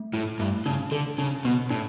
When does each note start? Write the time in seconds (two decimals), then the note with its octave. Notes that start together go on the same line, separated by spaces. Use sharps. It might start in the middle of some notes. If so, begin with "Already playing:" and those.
Already playing: A3
0.13 A2 E4
0.39 G2 A3
0.66 C#3 D4
0.91 D3 A4
1.18 C#3 D4
1.45 B2 B3
1.70 A2 D4